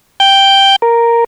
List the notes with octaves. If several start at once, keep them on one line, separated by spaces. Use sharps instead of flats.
G5 G6
A#4